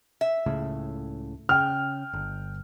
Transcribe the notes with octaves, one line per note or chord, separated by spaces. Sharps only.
E5
C#2 A2 C#3
C#3 G5 F6
G1